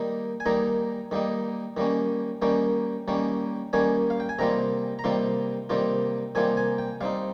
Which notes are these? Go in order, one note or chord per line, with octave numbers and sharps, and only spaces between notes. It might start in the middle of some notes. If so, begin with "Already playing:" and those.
Already playing: D#3 G3 A#3 D#4
G#5
D#3 G3 A#3 D#4 A#5
D#3 G3 A#3 D#4
D#3 G3 A#3 C#4
D#3 G3 A#3 C#4 G5
D#3 G3 A#3 C#4
D#3 G3 A#3 C#4 G#5
F5
G5
G#5
C3 D#3 G3 A#3 F4 A#5
A#5
C3 D#3 G3 A#3 F4 C6
C3 D#3 G3 A#3 F4
C3 D#3 G3 A#3 F4 G#5
G#5
G5
G3 C4 D#4 F5